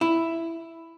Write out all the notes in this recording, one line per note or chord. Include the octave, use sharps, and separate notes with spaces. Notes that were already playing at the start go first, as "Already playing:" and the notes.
E4